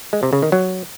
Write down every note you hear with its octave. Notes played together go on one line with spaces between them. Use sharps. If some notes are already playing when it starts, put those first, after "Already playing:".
G#3
C3
C#3
D#3
F#3